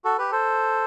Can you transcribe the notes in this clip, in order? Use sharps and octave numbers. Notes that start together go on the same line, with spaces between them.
F#4 A4
G4 B4
A4 C5